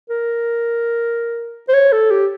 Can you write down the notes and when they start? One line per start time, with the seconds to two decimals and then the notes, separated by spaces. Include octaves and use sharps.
0.10 A#4
1.68 C5
1.73 C#5
1.92 A4
2.11 G4